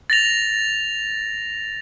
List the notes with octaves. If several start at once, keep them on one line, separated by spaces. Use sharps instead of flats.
A6 A#6 F7